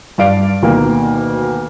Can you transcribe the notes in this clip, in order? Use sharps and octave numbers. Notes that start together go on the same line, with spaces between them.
G2 D5 F5 D7
D2 B2 D#3 A#3